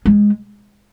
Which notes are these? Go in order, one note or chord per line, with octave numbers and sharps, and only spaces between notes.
G#3